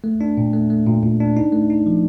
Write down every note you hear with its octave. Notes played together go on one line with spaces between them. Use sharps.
A3
D4
A#2
A3
A3
A#2
A#2
D4
D#4
A3
D#4
F3